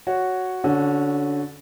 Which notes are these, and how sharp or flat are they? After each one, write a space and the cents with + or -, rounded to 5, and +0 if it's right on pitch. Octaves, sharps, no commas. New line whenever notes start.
F#4 +0 C#5 +0
D3 -20 C#4 -5 F#4 +5